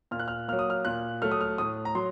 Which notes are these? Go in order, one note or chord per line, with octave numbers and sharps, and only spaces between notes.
A#2 F6
F#6
F6
F#3 A#3 F6
D#6
F6
A#2 F#6
F#3 A3 F6
D#6
F6
A2 D#6
A#5
F#3 C6